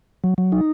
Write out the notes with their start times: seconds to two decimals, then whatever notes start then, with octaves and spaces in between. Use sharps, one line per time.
0.24 F#3
0.38 F#3
0.52 D#4